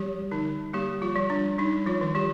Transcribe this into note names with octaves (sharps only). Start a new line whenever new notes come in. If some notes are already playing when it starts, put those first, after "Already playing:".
Already playing: F3 G3 G4
D3 D#4
G3 A#3 G4
F3 F4
G3
D4
G3 D#4
F3 F4
D#3
G3 G4